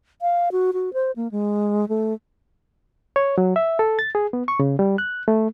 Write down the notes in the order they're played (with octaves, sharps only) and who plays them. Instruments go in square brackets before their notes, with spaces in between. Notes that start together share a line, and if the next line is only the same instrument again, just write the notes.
[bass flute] F5
F#4
F#4
C5
A#3
G#3
A3
[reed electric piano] C#5
F#3
E5
A4
A6
G#4
B3
C#6
C#3
G3
F#6
A3